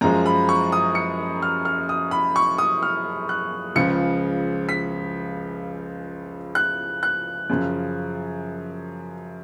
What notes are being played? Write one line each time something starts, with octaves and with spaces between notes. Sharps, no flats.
F#2 F3 G#3 A#5
B5
C#6
D#6
C#7
F6
F6
D#6
B5
C#6
D#6
F6
F#6
C#2 C#3 F3 C#7
B6
F#6
F#6
F#2 C#3 F3